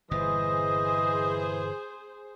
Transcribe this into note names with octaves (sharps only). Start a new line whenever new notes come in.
G1 A#2 E3 G#4 C5 D#5